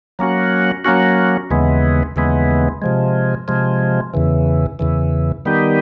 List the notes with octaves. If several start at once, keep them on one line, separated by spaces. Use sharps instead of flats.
F#3 A#3 C#4 F#4
F#3 A#3 C#4 F#4
D#2 C#3 E3 G#3 B3
D#2 C#3 E3 G#3 B3
C3 F3 G#3
C3 F3 G#3
E2 C#3 E3
E2 C#3 E3
D#3 G3 B3 D#4 G4